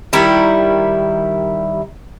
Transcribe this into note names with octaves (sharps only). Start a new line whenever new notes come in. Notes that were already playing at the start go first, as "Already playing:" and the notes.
D#3 G3 E4